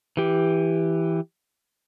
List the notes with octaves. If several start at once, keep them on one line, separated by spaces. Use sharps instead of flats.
E3 G4